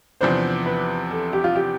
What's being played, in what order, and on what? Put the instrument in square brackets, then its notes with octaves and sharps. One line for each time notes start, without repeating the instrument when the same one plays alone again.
[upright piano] E2 C3 F3 B3 D4 [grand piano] C5
[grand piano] B4
A4
G4
F4
G4